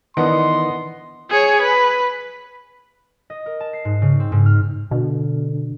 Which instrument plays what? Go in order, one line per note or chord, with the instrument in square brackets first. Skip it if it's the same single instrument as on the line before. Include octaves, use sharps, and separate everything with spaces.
[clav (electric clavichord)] D#3 E3 D4 [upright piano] B3 D#5 F#5 [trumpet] C6
[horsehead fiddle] G#4 C#5
B4
[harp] D#5
A#4
A5
C7
G#2
C#3
C4
G#2
F6
[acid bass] B2 [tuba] D3